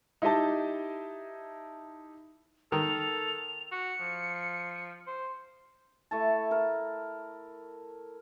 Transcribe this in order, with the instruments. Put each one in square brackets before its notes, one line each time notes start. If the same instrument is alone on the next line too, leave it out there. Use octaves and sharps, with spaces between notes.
[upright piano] D#4 E4 G4 D#5 A5
[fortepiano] D#3 [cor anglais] A4 [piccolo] F7
[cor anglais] F#4 [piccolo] C#7
[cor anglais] F3
C5
[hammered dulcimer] A3 E4 A5
A#4